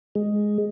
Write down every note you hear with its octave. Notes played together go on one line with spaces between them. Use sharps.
G#3